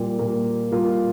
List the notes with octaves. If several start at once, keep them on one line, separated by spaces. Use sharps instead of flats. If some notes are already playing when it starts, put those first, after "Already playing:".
Already playing: A#2 G3 A#3 F4
A#2 G3 A#3 F4
A#2 G3 A#3 F4